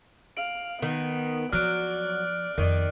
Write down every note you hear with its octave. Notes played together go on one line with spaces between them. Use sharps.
F5 D7 F#7
D#3 B3
F3 F#3 D5 F6 F#6 D7
F2 D#3 B3 D5